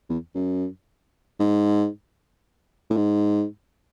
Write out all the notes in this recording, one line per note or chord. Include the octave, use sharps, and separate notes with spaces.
E2
F#2
G#2
A2
G#2